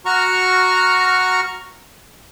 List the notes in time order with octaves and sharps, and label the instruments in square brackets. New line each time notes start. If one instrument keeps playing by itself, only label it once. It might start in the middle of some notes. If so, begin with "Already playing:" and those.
[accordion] F#4 A#5 C#6 F6